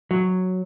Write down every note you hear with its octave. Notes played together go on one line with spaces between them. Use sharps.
F#3